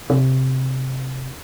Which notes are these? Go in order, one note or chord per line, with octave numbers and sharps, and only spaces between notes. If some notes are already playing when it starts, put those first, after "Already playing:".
C3